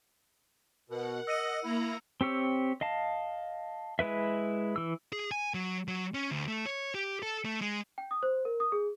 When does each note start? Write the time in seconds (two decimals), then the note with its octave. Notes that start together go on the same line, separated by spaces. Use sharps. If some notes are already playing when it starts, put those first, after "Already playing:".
0.90 B2 A#4 F#5
1.27 D#5 E6 C#7 D#7
1.64 A#3 E4 A#5
2.21 C4 G4 C#5 E6
2.81 D#5 F5 A5
3.99 G#3 E4 B4 E5
4.76 E3 E6
5.12 G#4
5.31 G#5
5.54 F#3
5.88 F#3
6.14 C#4
6.31 D2
6.48 A3
6.66 C#5
6.95 G4
7.23 A4
7.45 A3
7.61 G#3
7.98 G5
8.11 D#6
8.23 C5
8.45 A#4
8.60 D#6
8.72 G#4